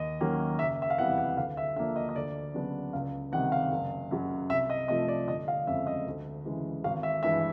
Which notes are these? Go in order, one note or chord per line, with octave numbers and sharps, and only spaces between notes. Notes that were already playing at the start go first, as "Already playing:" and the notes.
Already playing: D#2 D#5
D#3 F#3 A#3 C#4
F#1 E5
E5
F5
E2 C3 E3 G3 F#5
F#5
D2 F5
E5
D3 F3 A#3 D4 E5
D#5
D#5
D2 D5
C#3 F#3 B3 D4
C#2 F5
C3 D#3 G3 F#5
F5
F#1
F#2 C#3 F#3
C2 E5
D#5
C3 F3 A3 D#5
D5
G1 D#5
F5
F2 C#3 F3 G#3 E5
D#5
D2
C#3 E3 G#3
G#1 F5
E5
G2 E3 G#3 E5